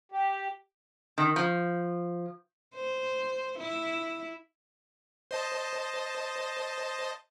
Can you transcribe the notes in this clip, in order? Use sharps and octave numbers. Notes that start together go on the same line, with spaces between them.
G4
D#3
F3
C5
E4
C5 D#5 A5